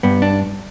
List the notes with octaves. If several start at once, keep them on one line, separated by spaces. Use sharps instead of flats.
G2 B3
D4